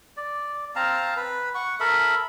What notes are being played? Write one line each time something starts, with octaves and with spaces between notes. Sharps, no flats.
D5
C4 F5 A5 A#5
B4
F#5 C#6
A4 A#4 E5 B5